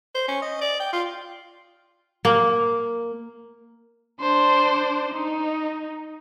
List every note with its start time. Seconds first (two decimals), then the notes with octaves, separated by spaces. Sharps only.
0.15 C5
0.28 C#4
0.42 D#5
0.61 D5
0.80 G5
0.93 F4
2.25 A#3
4.21 D4 C5
5.14 D#4